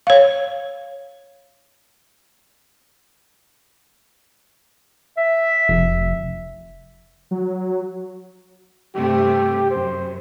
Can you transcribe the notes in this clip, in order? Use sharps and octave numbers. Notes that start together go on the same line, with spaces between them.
C#5 F5
E5
F1
F#3
G2 C3 A3 G4
F#2 C5